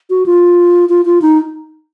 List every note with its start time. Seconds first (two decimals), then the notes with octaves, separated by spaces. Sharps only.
0.10 F#4
0.26 F4
0.89 F4
1.05 F4
1.22 D#4